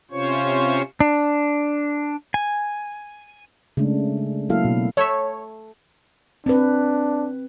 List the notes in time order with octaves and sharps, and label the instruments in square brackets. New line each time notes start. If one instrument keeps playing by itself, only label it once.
[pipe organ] C3 C#4 F4 C5 C#5 C#6
[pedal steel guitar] D4
G#5
[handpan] C#3 G#3 A3 D4
F#3 A#3 E4 A4 F5
B2
[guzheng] A3 A4 E5 [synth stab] C#5
[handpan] C4 B4 [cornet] D4